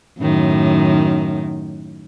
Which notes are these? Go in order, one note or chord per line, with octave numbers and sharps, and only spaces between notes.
F#2 A2 D#3